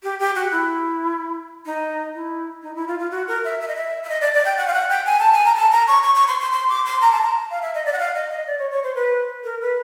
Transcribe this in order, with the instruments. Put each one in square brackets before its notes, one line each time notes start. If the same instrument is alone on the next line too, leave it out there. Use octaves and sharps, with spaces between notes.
[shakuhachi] G4
G4
F#4
E4
D#4
E4
D#4
E4
F4
F4
F#4
A#4
E5
E5
D#5
E5
E5
D#5
D5
D5
G5
F#5
F5
F#5
G5
G#5
A5
G#5
A#5
A5
A#5
C#6
C#6
C#6
C6
C6
C6
D6
C6
A#5
A5
A#5
F5
E5
D#5
D5
F#5
F5
D#5
D#5
D5
C#5
C#5
C5
B4
A#4
B4